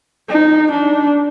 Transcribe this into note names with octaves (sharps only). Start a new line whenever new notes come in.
D#4
D4